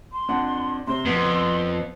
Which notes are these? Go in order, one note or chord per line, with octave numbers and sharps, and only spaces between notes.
C6
F2 D4 F#5
C3 C5 C6
F2 F3 B3